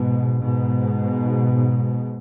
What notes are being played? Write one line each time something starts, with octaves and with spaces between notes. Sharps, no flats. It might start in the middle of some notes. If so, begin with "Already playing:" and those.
Already playing: G#2 B2
G#2 B2